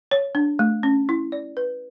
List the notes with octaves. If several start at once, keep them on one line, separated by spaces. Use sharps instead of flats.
C#5
D4
A3
C#4
E4
D5
B4